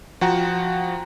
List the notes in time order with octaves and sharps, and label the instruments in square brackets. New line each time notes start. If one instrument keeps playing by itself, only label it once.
[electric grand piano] F3 F#4 F#5 G5 A#5